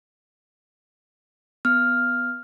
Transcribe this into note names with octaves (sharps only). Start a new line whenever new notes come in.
B3 F6